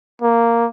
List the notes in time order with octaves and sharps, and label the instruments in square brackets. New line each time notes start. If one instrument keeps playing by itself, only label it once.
[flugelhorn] A#3